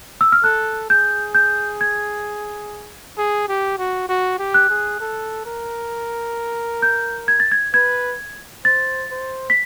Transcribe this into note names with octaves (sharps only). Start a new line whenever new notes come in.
E6
F6
A4 F#6
G#4 G6
G6
G#6
G#4
G4
F#4
F#4
G4
F#6
G#4
A4
A#4
G6
G#6
A6
G#6
B4 G#6
C5 A6
C5
B6